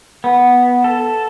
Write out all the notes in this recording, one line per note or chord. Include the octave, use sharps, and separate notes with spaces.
B3
A4